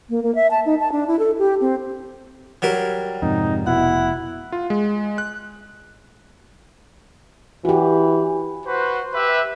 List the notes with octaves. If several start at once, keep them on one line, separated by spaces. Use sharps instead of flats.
A#3
A#3
E5
A5
D#4
A5
D4
E4
A4
G4
C4
F#3 G3 A#4
F2 G#2 C3 D#4
F1 B2 E4 F#5
F4
G#3
F#6
E3 F#4 G4
F#4 B4 C5
G4 B4 E5